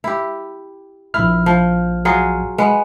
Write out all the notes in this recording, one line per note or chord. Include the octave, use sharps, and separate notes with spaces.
E4 G4
A#1 E4 F6
F3
F#3 F4 G#4
G#3 B3